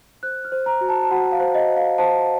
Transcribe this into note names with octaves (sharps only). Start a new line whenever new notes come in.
C5 F#6
F6
C5
A#5
F#4
A5
A5
F#4 F#5
F5
C5
D#5
C5
F5
C5 A5